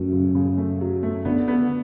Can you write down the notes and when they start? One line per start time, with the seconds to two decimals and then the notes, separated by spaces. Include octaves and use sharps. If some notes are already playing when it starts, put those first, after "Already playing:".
Already playing: F#2 F#3 A3
0.13 C#3
0.35 C#3
0.58 A3
0.81 F#3
1.03 A3
1.25 D3 B3
1.48 B3